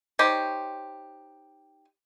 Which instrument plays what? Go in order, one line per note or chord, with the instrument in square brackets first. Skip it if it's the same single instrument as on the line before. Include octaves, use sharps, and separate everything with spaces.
[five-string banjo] D#4 G4 C5 C#5